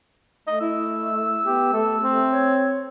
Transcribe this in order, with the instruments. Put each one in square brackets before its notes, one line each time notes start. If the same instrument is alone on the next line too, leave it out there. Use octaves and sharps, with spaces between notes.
[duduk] A3 [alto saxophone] D#5
[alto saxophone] E4 [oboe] E6
[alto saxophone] B3 [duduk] G4
[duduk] A3 [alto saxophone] A4
[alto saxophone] C4
[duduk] C#5